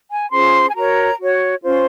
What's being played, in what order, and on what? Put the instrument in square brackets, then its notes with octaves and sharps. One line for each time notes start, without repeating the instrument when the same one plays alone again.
[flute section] G#5
C#4 F4 G#4 C5 C6
G#5
F#4 A#4 C#5 A#5
F#4 C#5
C#4 F4 C5